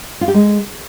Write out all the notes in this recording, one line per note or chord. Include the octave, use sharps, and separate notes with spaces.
F4
G4
G#3